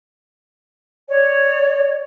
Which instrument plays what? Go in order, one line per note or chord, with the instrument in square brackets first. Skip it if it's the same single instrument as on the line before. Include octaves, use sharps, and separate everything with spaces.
[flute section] C#5 [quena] D5